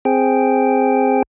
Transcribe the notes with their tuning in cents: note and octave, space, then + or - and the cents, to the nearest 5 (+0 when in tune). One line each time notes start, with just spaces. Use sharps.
C4 +0 G#4 +0 G5 +0